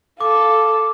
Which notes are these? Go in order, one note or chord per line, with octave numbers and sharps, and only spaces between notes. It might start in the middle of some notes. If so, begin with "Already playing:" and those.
A4 F5 D6